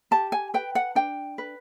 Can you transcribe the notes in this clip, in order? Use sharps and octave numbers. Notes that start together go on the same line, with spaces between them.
G4 A5
G#5
B4 G5
F#5
D4 G5
B4